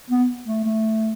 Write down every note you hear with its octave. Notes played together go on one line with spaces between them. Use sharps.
B3
A3
A3